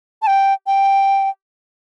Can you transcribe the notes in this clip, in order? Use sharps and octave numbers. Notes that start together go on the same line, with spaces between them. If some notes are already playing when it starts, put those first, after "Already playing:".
A5
G5
G5